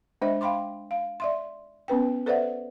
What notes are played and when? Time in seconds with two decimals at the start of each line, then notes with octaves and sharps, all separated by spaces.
0.21 G#3 D4 C5 D#5 E5
0.41 F5 G5 B5 C6 D6
0.91 F5
1.20 D5 E5 C6
1.88 B3 C#4 B4 G5
2.26 A4 B4 C5 D5 E5 F#5